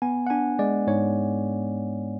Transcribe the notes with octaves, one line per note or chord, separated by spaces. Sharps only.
B3 G#5
F#5
D4 G#5
G#3 D5
G#2 C#5